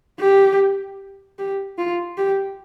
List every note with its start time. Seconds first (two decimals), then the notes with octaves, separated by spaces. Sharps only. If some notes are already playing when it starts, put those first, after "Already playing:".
0.20 G4
1.39 G4
1.78 F4
2.18 G4